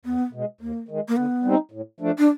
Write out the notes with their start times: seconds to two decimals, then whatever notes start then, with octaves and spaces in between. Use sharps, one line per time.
0.05 E2 B3
0.33 B2 G#3
0.61 D#2 A#3
0.89 D#3 G#3
1.08 A#3
1.16 D3 B3
1.44 G3 C4 D#4
1.71 A2
2.01 F3 A3 D4
2.18 D4